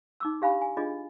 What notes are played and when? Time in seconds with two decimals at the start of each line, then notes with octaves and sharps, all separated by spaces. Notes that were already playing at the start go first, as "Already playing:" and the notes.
0.20 D#4 D6 E6
0.41 D4 G4 F5 G#5 B5
0.62 G#5
0.77 D4 F4 G#4 D#5